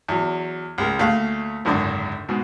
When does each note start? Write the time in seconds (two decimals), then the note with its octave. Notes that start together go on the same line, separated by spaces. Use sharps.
0.08 E2 F#3
0.78 C#2 G#3 A#4
0.99 D2 A3 A#3 F5 F6 F#6
1.65 G#1 C#2 F#2 D3 D4
2.29 G#2 B2